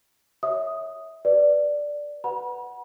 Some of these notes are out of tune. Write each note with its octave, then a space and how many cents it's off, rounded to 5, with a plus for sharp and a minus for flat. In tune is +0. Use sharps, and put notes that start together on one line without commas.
C#5 +0 E5 -25 D#6 +0
B4 +0 D5 +0
B4 +0 F#5 +0 B5 -40